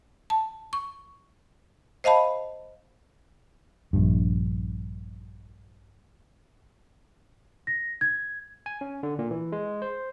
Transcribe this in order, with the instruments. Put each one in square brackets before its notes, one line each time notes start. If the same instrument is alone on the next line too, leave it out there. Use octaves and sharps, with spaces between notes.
[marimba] A5
C#6
C5 D#5 F5 A5 B5
[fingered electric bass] A#1 G2
[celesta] A#6
G#6
[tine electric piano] G#5
C#4
D3
A#2
E3
G#3
C5